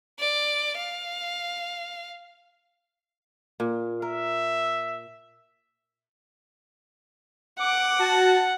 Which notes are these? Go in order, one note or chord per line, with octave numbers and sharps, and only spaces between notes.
D5
F5
A#2
A#4 E5
F#5 D6
F#4 A5